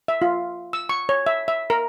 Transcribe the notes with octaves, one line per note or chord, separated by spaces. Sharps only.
E5
F4
E6
C#6
C#5
E5
E5
A#4